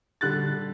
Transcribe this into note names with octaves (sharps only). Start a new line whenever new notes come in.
D3 G3 F#6 A6